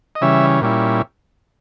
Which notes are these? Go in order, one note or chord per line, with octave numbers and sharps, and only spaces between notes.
D#5
C#3 E3 G3 C#4 E5
A#2 G3 C#4 E4